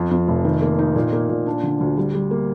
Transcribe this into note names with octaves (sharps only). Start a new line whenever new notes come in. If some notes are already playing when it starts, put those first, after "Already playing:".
Already playing: F2
F2
F1
D#3
A#3
D#4
A#2
A#3
A#2
D4
D3
D2
G3
G3
A#3